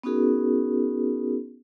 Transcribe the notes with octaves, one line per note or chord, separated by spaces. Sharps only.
B3 C#4 D#4 F#4 G#4 A#4